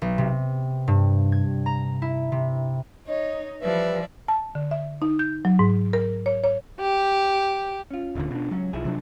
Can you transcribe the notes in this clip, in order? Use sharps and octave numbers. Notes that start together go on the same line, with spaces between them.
B1
C3
G2
G#6
A#5
E4
C3
D#4 C#5 D#5
E3 F3 G3 B4 D5 E5
A5
D3
E5
D#4
G6
F#3
G#2
A#4
C#5
C#5
G4
C#4 F4
D#1 D2 D3
B2 D4
C#2 F#2 F#3 C#4
B1 F3 E4 G#4
C3 F#3 D4